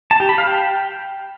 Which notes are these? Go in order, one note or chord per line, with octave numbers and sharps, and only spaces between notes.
A5
G4
B5
F5
G5